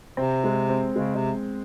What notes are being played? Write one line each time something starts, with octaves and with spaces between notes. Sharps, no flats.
C3 C4
G#3
C4
C#3 G#3
C3